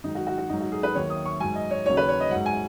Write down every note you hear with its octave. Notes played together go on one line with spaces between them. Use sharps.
G#2 D#3 F#3 D#4
F#4
F#4
F#4
G#2 F#3 D#4
F#4
G#4
B4
D#2 D#3 F#3 C#5
D#6
C#6
G#2 F#3 G#5
D#5
C#5
D#2 C#3 F#3 C#5
B4
C#5
D#5
G#2 F#3 F#5
G#5